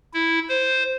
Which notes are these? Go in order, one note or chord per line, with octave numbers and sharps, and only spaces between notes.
E4
C5